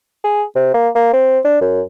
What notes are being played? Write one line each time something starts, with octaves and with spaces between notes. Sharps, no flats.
G#4
C3
A#3
A#3
C4
D4
F#2